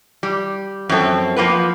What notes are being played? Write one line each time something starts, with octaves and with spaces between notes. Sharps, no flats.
G3
F#2 F3 C4 A4
F3 A#3 B3 B4